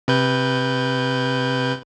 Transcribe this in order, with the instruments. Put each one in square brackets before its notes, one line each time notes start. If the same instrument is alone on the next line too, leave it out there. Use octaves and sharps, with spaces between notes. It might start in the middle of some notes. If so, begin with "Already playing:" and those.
[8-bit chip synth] C3 B4 G6